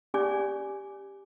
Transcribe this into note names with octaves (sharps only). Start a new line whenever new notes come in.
C#4 G4 D5 G#5 D6